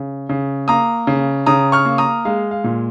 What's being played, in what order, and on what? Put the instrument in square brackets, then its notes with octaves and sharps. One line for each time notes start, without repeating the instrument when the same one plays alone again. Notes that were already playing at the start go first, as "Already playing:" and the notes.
Already playing: [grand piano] C#3
C#3
A#3 A#5 D#6
C#3
C#3 A#5 D#6
C#6 F6
A#3
A#5 D#6
G#3 F5
F5
A#2